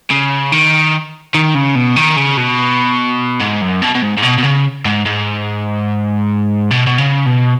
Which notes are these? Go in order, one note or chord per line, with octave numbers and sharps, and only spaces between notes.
C#3
D#3
D#3
C#3
B2
D#3
C#3
B2
G#2
F#2
B2
B2
G#2
G#2
B2
B2
C#3
G#2
G#2
B2
B2
C#3
B2